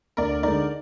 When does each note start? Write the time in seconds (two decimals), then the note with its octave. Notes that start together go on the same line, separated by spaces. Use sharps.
0.17 D2 A#4 D5
0.43 D3 G#3 D#4 A#4 D5